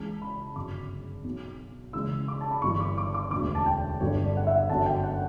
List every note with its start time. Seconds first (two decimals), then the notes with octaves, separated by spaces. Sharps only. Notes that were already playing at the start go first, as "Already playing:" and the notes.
Already playing: C#2 C#3 E3 A5
0.22 B5
0.55 G1 F#2 C#3 D6
1.24 B1 B2
1.93 C#2 C#3 E3 E6
2.28 D6
2.41 A5
2.51 B5
2.62 G1 G2 E3 C#6
2.80 D6
2.98 D6
3.14 D6
3.31 E1 D2 D3 D6
3.55 A5
3.66 G5
4.00 G1 G2 D3 C#5
4.24 D5
4.37 F#5
4.47 E5
4.69 G1 F#2 D3 A5
4.86 G5
5.04 F#5